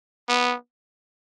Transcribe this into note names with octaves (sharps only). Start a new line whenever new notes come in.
B3